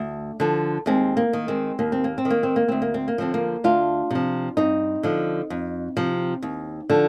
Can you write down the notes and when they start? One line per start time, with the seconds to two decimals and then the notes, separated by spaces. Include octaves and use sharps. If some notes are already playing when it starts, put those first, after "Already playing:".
Already playing: D2
0.40 D3 F3
0.86 D#2 G#3 C4
1.17 A#3
1.33 D#3
1.48 G#3 C4
1.79 D#2 A#3
1.92 C4
2.04 A#3
2.18 C4
2.25 D#3
2.30 A#3
2.43 C4
2.56 A#3
2.68 D2 C4
2.82 A#3
2.94 C4
3.08 A#3
3.18 D3 F3 C4
3.34 A#3
3.64 D2 D4 F4
4.11 C3 F3
4.57 G2 C4 D#4
5.03 D3 F3
5.50 F2
5.97 C3 F3
6.43 D#2
6.90 D3 F3